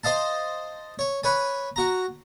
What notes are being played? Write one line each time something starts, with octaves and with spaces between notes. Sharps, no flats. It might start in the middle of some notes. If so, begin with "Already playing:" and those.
C5 D#5 F5 A5
C#5
B4 C#5 G#5
F#4 A#5